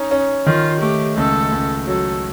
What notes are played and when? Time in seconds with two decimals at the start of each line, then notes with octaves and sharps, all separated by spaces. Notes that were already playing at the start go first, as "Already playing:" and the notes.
Already playing: C#4 D#4
0.11 C#4
0.46 D#3 F4
0.81 A3 G4
1.17 C#2 A4
1.52 C#2
1.87 F#3 A4